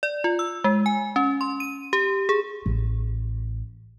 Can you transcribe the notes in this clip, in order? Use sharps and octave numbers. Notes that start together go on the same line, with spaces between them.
D5
F4
E6
G#3
G#5
C#4
C6
D#7
G4
G#4
A1